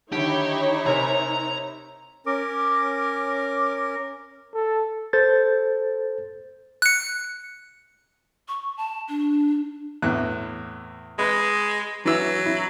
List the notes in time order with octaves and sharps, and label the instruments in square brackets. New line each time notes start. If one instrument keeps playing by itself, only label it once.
[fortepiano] D3 D#3 [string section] D#4 E4 C#5 [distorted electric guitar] G4
[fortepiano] C3 A#4 G#5 [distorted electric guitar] A#5
[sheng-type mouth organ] C#4 A#4 [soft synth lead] D6
[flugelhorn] A4
[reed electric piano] A4 C5 G6 A6
[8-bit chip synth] F#6 C#7
[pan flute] C#6
A5
D4
[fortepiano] E2 A2 F#6
[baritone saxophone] G#3 [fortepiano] B4
[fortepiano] E3 E6 [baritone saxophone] F#3
[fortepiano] E4